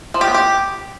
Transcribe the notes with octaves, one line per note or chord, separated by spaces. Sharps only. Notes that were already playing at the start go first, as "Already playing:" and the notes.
F3
G4
B3
G4